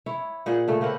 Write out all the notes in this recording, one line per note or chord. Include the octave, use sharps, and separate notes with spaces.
E4 C#5
A#2 G#4 F#5
C#3 A3
A#3 C4 B4 F#5